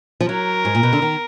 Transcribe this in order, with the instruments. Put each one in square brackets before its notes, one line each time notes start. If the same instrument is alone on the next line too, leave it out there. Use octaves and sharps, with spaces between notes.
[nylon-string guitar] F3
[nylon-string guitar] F#3 [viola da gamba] A#4
[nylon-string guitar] G#2
A#2
B2
D3
D#3